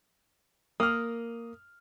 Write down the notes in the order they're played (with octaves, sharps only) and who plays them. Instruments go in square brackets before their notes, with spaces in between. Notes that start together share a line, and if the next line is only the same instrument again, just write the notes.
[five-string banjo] A#3 [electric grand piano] D#6 F6